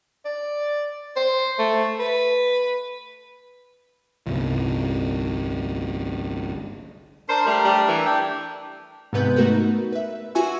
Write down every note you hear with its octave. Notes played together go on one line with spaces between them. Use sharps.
D5
C5
A3
B4
G1 C2
D4 A#4 C5
G3 A3 D4 A#4
G3
E3
D4 G4
G#2 C3 B3 B4 G6
A3 D#4 F#4 A#4 B4
B4 E5
F4 F#4 E5 G#5 C#6 E6